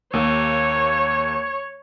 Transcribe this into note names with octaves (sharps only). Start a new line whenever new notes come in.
D#2 A#3 C#5